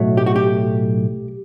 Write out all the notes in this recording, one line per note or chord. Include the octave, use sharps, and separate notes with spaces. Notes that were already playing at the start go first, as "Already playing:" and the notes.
Already playing: B1 A2 F#3 A3
G4
F#4
G4